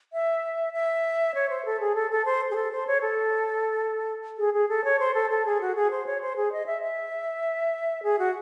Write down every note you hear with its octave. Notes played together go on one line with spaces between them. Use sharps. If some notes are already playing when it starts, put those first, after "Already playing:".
E5
E5
C#5
C5
A4
G#4
A4
A4
C5
G#4
A4
C5
C#5
A4
G#4
G#4
A4
C#5
C5
A4
A4
G#4
F#4
G#4
C5
C#5
C5
G#4
D#5
E5
E5
G#4
F#4